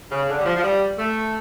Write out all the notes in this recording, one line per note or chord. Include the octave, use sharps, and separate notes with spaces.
C#3
D3
G3
F3
F3
G3
A3